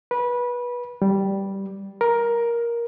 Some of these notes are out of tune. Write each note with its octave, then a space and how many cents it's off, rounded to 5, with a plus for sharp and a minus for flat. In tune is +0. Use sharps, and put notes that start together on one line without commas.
B4 -20
G3 -5
A#4 +10